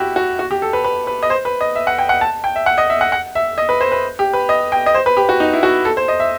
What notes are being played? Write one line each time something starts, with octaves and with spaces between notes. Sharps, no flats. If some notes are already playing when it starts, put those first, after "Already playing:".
Already playing: E4 F#4 G4
F#4
F#4
G4
A4
B4
B4
B4
D#5
C5
B4
D#5
E5
F#5
G5
F#5
A5
G5
E5
F#5
D#5
E5
F#5
F#5
E5
D#5
B4
C5
B4
G4
B4
D#5
G5
D#5
C5
B4
G4
F#4
D#4
E4
F#4
A4
C5
D#5
E5